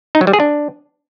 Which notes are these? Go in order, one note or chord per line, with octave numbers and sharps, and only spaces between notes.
D#4
F#3
G3
G#4
D4